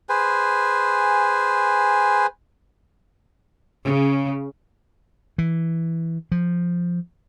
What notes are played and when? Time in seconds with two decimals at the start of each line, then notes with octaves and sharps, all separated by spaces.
0.09 G#4 B4 C5 G#5
3.84 C#3
5.38 E3
6.32 F3